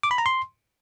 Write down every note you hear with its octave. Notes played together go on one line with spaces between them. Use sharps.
D6
B5
A#5
C6